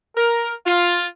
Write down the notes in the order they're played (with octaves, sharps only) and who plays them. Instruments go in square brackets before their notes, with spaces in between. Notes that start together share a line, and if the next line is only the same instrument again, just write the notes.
[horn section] A#4
F4